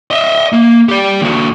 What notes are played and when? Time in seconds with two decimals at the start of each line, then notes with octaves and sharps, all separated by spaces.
0.11 D#5 E5
0.52 A#3
0.89 G4 D5
1.21 D#2 F#4